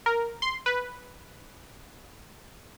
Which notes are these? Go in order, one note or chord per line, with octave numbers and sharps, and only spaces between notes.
A#4
C6
B4